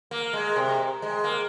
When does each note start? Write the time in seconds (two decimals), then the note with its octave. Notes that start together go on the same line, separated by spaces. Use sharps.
0.11 A#3
0.33 G#3
0.56 C3
1.02 G#3
1.24 A#3